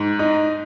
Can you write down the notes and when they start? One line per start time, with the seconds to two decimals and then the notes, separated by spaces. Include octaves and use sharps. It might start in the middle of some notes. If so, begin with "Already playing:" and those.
Already playing: G#2
0.19 D#4